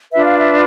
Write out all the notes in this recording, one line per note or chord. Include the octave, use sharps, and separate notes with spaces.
D4 F4 B4 E5
F5
E5